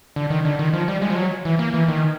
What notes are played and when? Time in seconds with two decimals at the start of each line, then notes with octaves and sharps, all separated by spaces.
0.16 D3
0.30 D#3
0.45 D3
0.59 D#3
0.73 F3
0.88 G3
1.02 G#3
1.10 F3
1.16 F#3
1.45 E3
1.59 A#3
1.74 E3
1.88 D#3